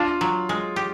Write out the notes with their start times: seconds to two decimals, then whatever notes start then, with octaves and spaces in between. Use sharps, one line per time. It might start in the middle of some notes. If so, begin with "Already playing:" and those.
Already playing: D4 F4
0.21 F#3
0.49 G#3
0.76 G4